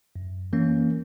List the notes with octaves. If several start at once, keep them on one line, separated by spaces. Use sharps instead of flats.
F#2
E3 A#3 C#4